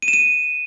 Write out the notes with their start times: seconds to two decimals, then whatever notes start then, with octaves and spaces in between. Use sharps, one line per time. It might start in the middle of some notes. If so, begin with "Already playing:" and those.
0.02 D#7
0.08 E7
0.13 D#7